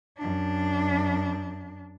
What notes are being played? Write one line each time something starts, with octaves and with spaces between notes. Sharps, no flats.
F#2 D4